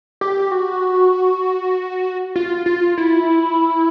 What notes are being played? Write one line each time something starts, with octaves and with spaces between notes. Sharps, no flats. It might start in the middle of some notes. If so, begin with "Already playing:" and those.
G4
F#4
F4
F4
E4